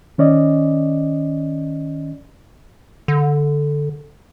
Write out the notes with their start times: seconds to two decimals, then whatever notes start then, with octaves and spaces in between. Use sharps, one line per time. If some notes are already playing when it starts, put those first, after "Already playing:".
0.18 D#3 C#4 D5 D#5
3.08 D3